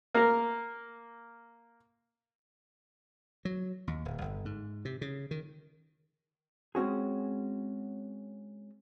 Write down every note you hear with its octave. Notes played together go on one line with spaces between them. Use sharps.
A#3 A#4
F#3
D#2
D1
G1
G#2
C3
C#3
D#3
G#3 C4 C#4 F#4 G#4